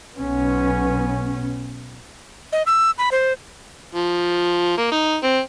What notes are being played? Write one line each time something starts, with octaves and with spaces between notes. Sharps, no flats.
B1 B3 C#4
D#5
E6
B5
C5
F3
A#3
D#4
C4